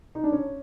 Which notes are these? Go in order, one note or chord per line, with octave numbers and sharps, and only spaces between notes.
D#4
D4
C#4